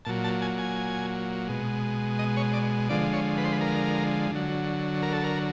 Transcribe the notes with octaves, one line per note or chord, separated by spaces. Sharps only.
A#2 F#3 A5
A5
G#5
G#5
B2 G#3
D#5
C#5
D5
D3 F3 G#3 D5
C#5
B4
C5
B4
A#4
D3 F#3
A#4
A4
A#4